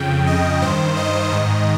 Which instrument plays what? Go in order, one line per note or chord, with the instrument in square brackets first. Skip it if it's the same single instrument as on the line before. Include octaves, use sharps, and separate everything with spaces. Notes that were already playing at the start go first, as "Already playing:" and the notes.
Already playing: [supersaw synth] F2 C#3 G5
D#5
G2 D#3 C5
D#5
G#2 D#3 D#5